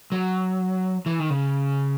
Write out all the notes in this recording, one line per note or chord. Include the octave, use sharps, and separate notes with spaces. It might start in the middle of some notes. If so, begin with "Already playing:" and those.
F#3
E3
D#3
C#3